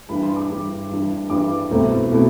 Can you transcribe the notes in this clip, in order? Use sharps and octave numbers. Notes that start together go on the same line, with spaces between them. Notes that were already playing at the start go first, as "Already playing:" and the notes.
G2 E3 G3 D4 B5
C6
D6
G2 E3 G3 D4
G2 E3 G3 D4
G2 E3 G3 D4 D6
C2 B2 A3 C4 E4
B2 A3 C4 E4